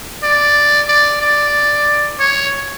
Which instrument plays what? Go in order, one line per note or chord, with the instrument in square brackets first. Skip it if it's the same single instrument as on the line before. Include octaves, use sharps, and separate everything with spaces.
[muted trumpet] D5
D5
D5
C#5